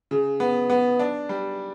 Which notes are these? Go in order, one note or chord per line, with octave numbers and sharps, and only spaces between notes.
C#3
B3
B3
D4
G3